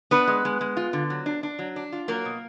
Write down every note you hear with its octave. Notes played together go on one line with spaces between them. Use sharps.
B3 D4 B4
G#3
G#3
G#3
F4
D3
F#3
D4
D4
F#3
D4
F4
F#3 A#3 A#4
B2